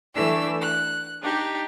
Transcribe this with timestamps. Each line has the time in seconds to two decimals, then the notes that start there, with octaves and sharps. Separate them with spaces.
0.15 E3 A3 D4 E6
0.61 F#6
1.21 D4 D#4 G4